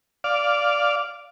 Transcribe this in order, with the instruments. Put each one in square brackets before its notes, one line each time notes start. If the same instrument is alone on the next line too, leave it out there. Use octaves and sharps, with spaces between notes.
[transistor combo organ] D5 F5